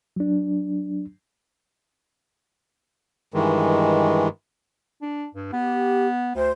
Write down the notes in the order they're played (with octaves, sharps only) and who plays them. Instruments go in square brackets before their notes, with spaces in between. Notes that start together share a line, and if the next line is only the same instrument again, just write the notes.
[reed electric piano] F#3 D4
[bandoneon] G2 D#3 E3 G#3
[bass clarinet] D4
G2
[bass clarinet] B3 [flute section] G4
[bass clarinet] D2 [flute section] C5